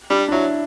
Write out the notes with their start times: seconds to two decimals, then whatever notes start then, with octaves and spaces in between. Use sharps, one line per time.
0.10 G3 D4
0.28 D4
0.32 F#3 E4